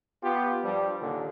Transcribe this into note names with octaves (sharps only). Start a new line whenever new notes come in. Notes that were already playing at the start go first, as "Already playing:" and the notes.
B3 F4 G4
G2 F3 G3
D#2 A#2 D3